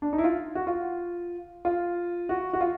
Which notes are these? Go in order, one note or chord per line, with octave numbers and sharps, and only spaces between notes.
D4
D#4
E4
F4
F#4
F4
F4
F#4
F#4
F4